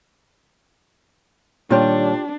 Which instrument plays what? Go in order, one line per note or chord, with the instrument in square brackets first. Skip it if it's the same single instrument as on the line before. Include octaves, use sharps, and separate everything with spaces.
[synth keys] A#2 [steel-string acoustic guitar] D#3 G3 C#5 [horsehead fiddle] D4 [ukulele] F4 G4